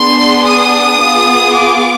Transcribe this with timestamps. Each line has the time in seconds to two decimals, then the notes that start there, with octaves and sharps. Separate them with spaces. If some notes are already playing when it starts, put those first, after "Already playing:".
Already playing: B3 D4 G#4 C6
0.46 D#6
1.00 B3 F4 G#4
1.54 D6